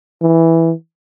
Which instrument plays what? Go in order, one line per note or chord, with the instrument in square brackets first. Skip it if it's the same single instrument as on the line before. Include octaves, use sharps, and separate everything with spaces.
[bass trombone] E3